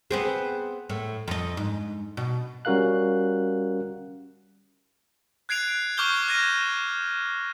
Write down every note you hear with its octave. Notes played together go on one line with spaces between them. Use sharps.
B3 C4 G#4
A2
F2 D#5
G#2
B2
G3 C#4 F#4 A#4 F5 F#6
F#6 G#6 C7 D7 F7
C#6 D6 F6 G6 G7
F6 G#6 A#6 D#7